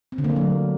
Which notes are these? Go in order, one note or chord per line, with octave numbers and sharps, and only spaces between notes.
C4
D3
A#3
A3
F#3